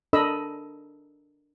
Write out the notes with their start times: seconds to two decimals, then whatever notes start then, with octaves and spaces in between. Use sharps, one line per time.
0.13 D4 A4 A#4 D#5 B5 E6